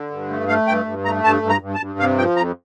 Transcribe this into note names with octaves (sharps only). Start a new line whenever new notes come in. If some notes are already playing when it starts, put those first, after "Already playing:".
Already playing: D3
G2
A3
A3 F5
G2 G5
G2
A3 A#5
G2 A5
G2
A#5
G2
A5
G2
C3 F5
F3 G5
F2 A#5